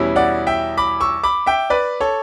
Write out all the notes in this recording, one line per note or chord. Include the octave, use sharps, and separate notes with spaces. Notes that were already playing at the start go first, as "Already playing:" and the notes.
Already playing: E2 B2 G3 C#4 E4
D5 F#5
E5 G5
B5 D6
C#6 E6
B5 D6
E5 G5
B4 D5
A4 C#5